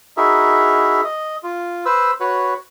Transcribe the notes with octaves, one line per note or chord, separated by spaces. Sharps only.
D#4 E4 F#4 G#4 A#4 E5
D#5
F4
B4 C5 E6
F#4 B4 C#5